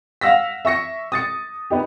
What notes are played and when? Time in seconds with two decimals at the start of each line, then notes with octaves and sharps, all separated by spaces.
0.21 F5 F#5 E6 A#6 B6
0.65 E5 C#6 A#6 C#7
1.12 D#6 A6 C#7
1.70 B3 D#4 G4